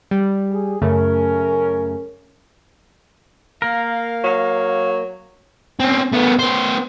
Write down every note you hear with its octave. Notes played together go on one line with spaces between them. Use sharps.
G3
G#4
F#2 C#3 A3 C#4 A#4
A#3 A#4 F5
F#3
C4 C#4
A3 B3
B3 C5